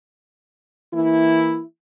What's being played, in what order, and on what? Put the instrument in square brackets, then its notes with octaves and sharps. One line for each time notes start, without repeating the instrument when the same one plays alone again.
[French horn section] E3 A#3 E4